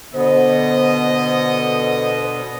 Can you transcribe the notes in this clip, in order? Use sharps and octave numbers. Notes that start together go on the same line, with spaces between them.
B2 D3 B3 C5 D#5